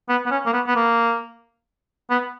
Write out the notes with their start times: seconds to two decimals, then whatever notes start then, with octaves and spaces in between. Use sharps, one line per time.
0.09 B3
0.26 B3
0.31 C#4
0.46 A#3
0.53 B3
0.67 B3
0.76 A#3
2.10 B3